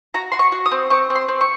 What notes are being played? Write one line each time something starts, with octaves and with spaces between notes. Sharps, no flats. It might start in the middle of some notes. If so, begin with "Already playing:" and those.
F#4 A#5
F#4 C6
C#6
F#4
D#6
C4
C4 C#6
C4
C6
C4
C#6